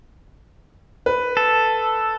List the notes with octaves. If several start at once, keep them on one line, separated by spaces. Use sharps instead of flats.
B4
A4